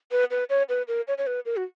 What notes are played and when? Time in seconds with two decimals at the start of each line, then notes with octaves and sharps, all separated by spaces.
0.11 B4
0.31 B4
0.49 C#5
0.69 B4
0.88 A#4
1.08 C#5
1.18 C#5
1.27 B4
1.46 A#4
1.57 F#4